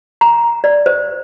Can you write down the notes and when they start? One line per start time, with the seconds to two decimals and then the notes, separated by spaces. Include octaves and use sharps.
0.21 A#5
0.64 D5
0.86 C5